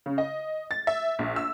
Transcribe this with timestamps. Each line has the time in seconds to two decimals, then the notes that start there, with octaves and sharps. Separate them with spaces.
0.06 C#3
0.18 D#5
0.71 A6
0.87 E5
1.19 A#1
1.36 E6